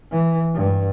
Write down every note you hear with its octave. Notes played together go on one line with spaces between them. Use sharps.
E3
G2